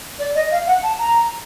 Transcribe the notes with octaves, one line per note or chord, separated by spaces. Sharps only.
D5
D#5
F5
F#5
A5
A#5